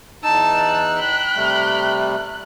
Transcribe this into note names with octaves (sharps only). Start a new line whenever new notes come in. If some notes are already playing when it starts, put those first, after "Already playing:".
E2 D#4 A5 E6
F#6
G5 B5
C3 G3 A3